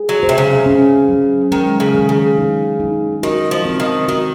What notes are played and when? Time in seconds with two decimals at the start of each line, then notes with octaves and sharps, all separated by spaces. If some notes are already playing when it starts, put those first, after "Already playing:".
Already playing: G#4
0.09 F#3
0.23 C5
0.29 C3
0.38 C#3
0.66 C#4
1.09 F#3
1.52 D#3 G#3
1.80 C#3
1.95 D#3
2.09 C#3
2.38 D#4
2.80 D#4
3.23 D#3 F#4
3.51 F3
3.65 C4
3.80 D#3
4.08 D#3 F#4